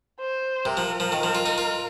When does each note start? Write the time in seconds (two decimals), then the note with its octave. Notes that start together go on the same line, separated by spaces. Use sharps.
0.20 C5
0.65 C3 A#4
0.77 F3
1.00 F3
1.12 D#3
1.23 F3
1.35 F4
1.46 D#4
1.58 F4